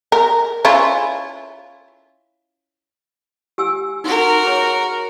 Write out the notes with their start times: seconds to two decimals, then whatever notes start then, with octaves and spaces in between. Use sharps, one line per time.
0.12 A#4
0.65 C#4 E4 F4
3.58 G4 G#5 E6
4.04 D#4 F#4 A#4 C6
4.45 G#4 C#5